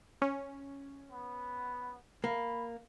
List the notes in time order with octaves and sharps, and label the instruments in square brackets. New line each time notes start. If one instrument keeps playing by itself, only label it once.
[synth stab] C#4
[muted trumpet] B3
[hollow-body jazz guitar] A#3 [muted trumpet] B5